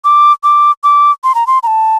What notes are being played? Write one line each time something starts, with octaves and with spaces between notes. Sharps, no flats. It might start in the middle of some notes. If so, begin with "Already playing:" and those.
D6
D6
D6
C6
A#5
C6
A#5
A5